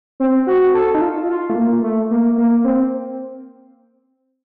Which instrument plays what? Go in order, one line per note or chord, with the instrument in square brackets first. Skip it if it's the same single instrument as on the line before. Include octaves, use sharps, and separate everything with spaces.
[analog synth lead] C4
F#4
A4
D#4
F4
F4
A3
A#3
A3
A#3
A#3
C4